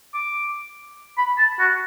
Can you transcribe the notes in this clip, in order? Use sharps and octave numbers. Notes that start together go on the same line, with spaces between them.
D6
B5
A5
F#4